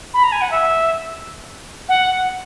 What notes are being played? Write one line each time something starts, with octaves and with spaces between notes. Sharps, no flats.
B5
A#5
G#5
F#5
E5
F#5